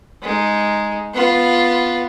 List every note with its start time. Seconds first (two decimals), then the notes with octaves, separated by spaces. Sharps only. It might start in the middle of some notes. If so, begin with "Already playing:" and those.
0.22 G#3 D#4
1.14 B3 F4